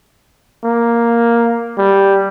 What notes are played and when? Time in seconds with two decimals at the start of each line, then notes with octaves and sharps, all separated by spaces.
0.64 A#3
1.78 G3